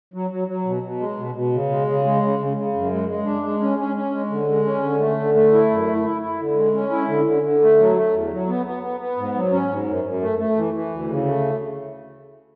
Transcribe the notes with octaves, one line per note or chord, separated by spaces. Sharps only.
F#3
F#3
F#3
B2
B2
G#3
B2
B2
C#3
G#3
C#3
G#3
C#3
C#3
C#3
F#2
G#3
G#3
D4
G#3
C#4
C#4
C#4
G#3
D3
G#3
C#4
D3
A3
D3
A3
E4
F#2
A3
E4
E4
D3
G#3
C#4
E4
D3
D3
D3
A3
F#3
A3
E2
F#3
B3
B3
B3
B3
G#2
F#3
C#4
G#2
F#2
F#2
A3
A3
E3
E3
D2
C#3
A3